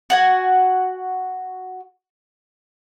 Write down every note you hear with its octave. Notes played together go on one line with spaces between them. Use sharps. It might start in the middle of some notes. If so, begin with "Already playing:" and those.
F#4 F#5 G#5